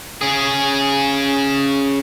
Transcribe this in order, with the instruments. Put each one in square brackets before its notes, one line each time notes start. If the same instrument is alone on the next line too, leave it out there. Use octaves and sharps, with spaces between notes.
[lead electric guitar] C#4 G#4